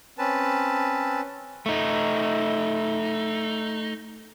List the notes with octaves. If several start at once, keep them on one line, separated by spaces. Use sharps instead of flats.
C4 C#4 B4 A5
A3 D#4